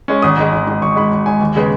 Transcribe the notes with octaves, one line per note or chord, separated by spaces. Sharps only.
G#3 C#4
G#1 D#6
G#2 G#3
G#1
G#2 G#3
G#1 C#6
G#2 G#3 B5
G#1
G#2 G#3 G#5
D#2
C#3 G#3 B3